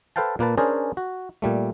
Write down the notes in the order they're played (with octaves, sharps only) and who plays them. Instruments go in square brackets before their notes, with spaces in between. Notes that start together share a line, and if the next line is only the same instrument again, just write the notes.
[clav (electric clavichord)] A4 B4 C5 F5 G5 A5
A#2 A#3 B4 A5
C#4 D4 G#4 A#4 C5 D5
F#4
A#2 G3 A3